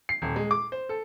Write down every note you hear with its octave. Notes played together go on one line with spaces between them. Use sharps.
C7
D#1
G#3
D6
C5
A4